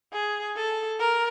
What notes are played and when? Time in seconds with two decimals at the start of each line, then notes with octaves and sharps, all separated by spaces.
0.13 G#4
0.56 A4
1.00 A#4